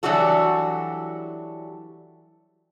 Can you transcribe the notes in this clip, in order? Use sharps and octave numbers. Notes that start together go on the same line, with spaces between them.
E3 F#3 G3 D4 F#4 A4